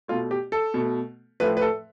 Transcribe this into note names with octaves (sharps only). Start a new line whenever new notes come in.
B2 A3 F4
G4
A4
B2 A3
A2 F3 A3 B4
B4
A4